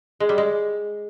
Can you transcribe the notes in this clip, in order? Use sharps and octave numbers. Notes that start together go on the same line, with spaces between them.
G#3
G3
G#3